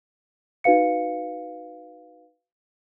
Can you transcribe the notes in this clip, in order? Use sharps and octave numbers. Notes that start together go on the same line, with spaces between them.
D#4 F#4 B4 F5 C#7